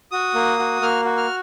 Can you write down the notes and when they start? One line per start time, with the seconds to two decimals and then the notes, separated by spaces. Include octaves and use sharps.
0.12 F#4 D#6
0.35 A#3
0.59 F#4
0.81 A#3 F6
1.05 F#4
1.17 F6